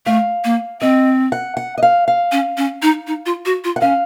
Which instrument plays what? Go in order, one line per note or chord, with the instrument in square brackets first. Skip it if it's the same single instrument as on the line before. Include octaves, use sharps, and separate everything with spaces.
[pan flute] A3 [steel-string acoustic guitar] F5
[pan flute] A#3
[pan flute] C4 [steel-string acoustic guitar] D#5
[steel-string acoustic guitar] F#5
F#5
D#5
F5
F5
[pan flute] C#4
C#4
D#4
D#4
F4
F#4
F4
[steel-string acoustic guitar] F#5
[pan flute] C#4 [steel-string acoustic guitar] F5